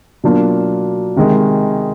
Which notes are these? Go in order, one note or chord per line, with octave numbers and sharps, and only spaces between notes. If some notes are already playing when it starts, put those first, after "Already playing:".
B2 F#3 A#3 D4 F4
C3 D#3 G#3